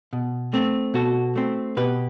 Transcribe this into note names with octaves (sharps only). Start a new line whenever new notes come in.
B2
A3 C4
B2 F#4 A4
A3 C4
B2 G4 B4